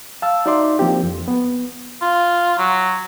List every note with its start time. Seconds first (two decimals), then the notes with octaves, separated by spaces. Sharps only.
0.22 F5 A5 E6
0.46 D#4 F#4 D5 E5 C6 D6
0.79 F3 A#3 C4 D4 G4
1.03 F2
1.28 B3
2.02 F4
2.58 F#3